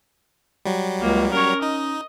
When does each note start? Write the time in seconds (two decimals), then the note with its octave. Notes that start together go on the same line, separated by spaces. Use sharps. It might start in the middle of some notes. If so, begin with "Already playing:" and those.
0.65 F#3 G3
1.01 C#2 A#3
1.32 C#4 A#4 C#5
1.62 D#4 D#5